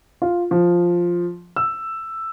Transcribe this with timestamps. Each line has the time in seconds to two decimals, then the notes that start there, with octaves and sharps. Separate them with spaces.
0.22 F4
0.51 F3
1.56 E6